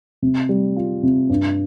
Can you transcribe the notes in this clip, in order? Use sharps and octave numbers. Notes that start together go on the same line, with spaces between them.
C3
G3
F4
C3
G2